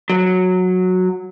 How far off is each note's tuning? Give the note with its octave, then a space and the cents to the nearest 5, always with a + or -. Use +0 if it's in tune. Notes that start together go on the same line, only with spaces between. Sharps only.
F#3 -10